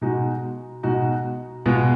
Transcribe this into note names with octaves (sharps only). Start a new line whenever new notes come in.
B2 G#3 D#4 F#4
B2 G#3 D#4 F#4
B2 G#3 B3 F4